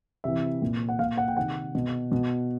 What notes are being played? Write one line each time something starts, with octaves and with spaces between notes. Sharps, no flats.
C3 E3 E5
A#2
F#5
A#2 F5
F#5
G5
C3 D#3 F#5
B2
B2